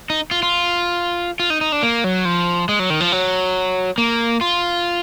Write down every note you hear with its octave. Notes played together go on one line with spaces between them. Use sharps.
D#4
F4
F4
F4
D#4
D#4
D4
A#3
F#3
F3
G#3
F#3
D#3
F3
F#3
A#3
F4